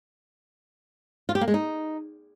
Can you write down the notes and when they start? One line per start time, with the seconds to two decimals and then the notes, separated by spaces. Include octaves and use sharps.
1.29 F4
1.35 G4
1.41 A#3
1.48 G#3
1.54 D#4